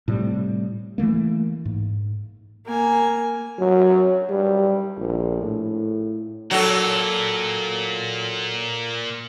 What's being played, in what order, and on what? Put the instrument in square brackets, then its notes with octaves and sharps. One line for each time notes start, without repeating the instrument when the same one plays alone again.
[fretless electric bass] A2 C3 G3
E3 F#3 A3 A#3
G#2
[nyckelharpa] A#3 G#5
[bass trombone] F#3
G3
A#1
A2
[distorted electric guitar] A#2 [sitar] F#3 A4